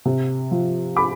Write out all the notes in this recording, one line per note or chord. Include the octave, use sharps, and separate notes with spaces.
C3
F3
B5 D6